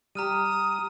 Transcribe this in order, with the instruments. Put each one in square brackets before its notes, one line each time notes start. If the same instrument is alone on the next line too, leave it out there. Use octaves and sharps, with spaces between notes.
[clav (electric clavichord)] G3 G4 [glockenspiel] A#5 F6 D#7 [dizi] D#6